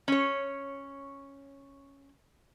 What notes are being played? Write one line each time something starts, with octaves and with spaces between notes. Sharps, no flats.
C#4 C#5